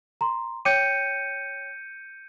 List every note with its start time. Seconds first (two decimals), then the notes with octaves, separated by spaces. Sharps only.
0.21 A#5 C6
0.65 C#5 G5 D6 G6 C#7 D#7